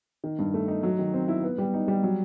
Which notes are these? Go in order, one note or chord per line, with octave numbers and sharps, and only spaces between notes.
D#3
G2
A3
D#4
F#3
D#3
C4
E4
B3
G3
D#4
G3
F#3